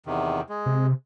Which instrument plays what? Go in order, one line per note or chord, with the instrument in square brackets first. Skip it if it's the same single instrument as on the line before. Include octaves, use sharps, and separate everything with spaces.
[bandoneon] E2 C3 D#3
G#3
[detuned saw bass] C3